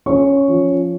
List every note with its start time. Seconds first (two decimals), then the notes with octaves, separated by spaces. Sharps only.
0.06 C#4 C#6
0.48 F3